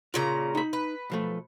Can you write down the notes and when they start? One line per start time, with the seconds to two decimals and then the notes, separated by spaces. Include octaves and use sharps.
0.14 A#2 C#3 F4 A#5
0.55 D#4 B5
0.73 B4
1.10 B1 F3 A3